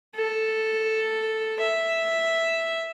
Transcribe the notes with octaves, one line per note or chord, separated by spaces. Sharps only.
A4
E5